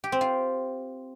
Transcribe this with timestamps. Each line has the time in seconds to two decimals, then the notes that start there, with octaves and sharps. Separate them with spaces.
0.04 G4
0.12 C4
0.21 F4